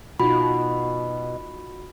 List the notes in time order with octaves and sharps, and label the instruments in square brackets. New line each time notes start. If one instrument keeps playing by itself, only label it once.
[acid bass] B2 [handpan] D#4 F4 [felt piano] F#4 [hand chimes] B5